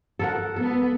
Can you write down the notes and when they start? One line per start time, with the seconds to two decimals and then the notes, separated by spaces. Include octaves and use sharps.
0.19 A4 A#4 F#5
0.56 B3 A4